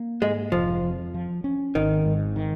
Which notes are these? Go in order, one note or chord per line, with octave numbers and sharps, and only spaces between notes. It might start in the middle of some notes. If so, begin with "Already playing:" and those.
Already playing: A#3
G#2 G#3
F1 F3
F2
F3
C#4
G#1 D#3
G#2
D#3